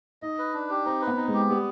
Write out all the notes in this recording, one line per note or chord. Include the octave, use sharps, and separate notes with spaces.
D#4 D#5
B4
D4
G4
C4 D#4
B4
B3
D#4
G#3
G4
G3 B3